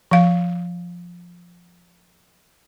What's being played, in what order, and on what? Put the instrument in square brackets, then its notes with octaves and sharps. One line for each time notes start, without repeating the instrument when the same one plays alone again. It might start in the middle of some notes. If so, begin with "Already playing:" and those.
[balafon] F3 F5